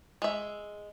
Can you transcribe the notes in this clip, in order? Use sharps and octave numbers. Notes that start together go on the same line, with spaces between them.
G#3 E5